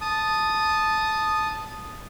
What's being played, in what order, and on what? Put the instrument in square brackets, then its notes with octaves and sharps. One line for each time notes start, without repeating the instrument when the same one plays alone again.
[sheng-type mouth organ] A5 D#6